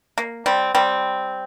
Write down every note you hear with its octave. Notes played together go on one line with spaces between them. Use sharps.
A#3
G3 C4
G3 C4